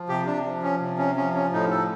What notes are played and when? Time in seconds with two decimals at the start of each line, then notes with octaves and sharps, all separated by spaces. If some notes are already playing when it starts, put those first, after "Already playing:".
Already playing: F3
0.09 C3 G4
0.26 D4
0.45 F3
0.63 C#4
0.81 C3
0.98 C#4
1.16 F3 C#4
1.35 C#4
1.52 A2 D#4
1.71 A4